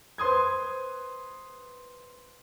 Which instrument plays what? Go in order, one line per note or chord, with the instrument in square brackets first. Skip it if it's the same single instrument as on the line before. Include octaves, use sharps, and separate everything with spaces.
[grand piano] B4 C5 C6 D#6 G#6